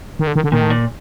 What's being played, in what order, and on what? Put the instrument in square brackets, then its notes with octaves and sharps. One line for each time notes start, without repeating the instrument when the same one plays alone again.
[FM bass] D#3
D3
D#3
D3
[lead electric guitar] A#2 [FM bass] D#3
[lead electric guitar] A2
A#2